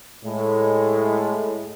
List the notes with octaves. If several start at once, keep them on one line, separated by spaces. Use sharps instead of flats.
A2 G#3